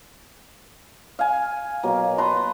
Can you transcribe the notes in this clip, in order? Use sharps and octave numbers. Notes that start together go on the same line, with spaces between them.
F5 G#5
B2 F#3 A#3
B4 A5 A#5 C6